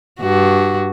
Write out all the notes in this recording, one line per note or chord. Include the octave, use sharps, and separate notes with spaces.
G2 F#4